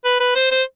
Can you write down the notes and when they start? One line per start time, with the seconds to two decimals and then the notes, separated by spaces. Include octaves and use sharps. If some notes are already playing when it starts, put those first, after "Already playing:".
0.05 B4
0.20 B4
0.36 C5
0.52 C5